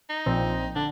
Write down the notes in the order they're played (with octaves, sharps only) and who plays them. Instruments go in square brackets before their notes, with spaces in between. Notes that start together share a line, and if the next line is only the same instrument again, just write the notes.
[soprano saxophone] D#4
[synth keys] A#1 A#2 F3 C4
[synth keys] D3 [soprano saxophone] D4